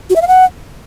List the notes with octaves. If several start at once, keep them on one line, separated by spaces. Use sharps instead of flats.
F#4
E5
F5
F#5